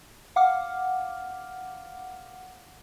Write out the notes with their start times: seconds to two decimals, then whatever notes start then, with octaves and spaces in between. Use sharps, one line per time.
0.36 F5 F#5 D6 F6